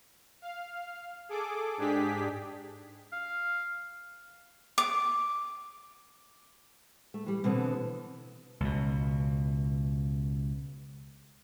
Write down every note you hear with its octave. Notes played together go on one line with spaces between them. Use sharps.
F5
G#4 A4 D6
G#2 D4 G4 G#4 B6
F5
D6
A3
E3 G3
B2 D3 E3 B3 C4
C#2 B2